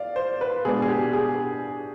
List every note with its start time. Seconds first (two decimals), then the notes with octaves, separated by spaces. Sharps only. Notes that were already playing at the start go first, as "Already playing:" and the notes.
Already playing: D5 F5
0.16 C5
0.41 B4
0.65 B2 G#3 D4 G#4
0.82 G#4
0.88 G4
1.13 G#4